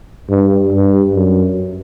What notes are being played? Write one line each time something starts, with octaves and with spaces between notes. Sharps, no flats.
G2
G2
F#2